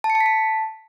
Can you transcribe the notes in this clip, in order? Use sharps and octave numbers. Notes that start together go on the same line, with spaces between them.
A5
C#7
A5
B6
A5